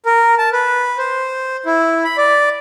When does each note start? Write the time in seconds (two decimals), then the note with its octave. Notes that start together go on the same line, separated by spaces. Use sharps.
0.06 A#4
0.38 A5
0.52 B4
0.98 C5
1.66 E4
2.04 B5
2.17 D5